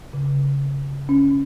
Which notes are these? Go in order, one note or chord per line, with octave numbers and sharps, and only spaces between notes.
C#3
C#4